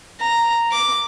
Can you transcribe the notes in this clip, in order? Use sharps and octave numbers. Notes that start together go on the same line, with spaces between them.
A#5
D6